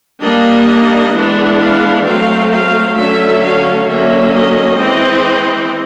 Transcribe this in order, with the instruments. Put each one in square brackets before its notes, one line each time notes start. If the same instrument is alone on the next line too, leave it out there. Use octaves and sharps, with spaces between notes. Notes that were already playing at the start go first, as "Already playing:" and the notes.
[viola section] G3 A#3 D4 D#5
E3 G#3 B3 D4
F5
F#3 A3 C4 F5
F5
D3 F#3 A3 C#4 E5
F5
D3 F#3 A#3 C#4 E5
D#5
E3 G#3 C4